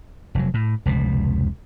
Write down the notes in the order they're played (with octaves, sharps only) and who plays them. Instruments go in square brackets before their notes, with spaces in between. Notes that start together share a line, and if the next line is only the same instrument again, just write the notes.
[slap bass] F1 F#3
A2
F1 C#2 B2